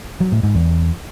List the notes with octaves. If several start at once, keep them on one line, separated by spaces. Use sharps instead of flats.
F#3
A2
G#2
E2